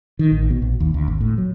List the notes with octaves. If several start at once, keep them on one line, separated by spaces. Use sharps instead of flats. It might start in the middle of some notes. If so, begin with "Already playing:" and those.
D#3
A1
B2
A#1
D#2
D2
G#1
A2
F#3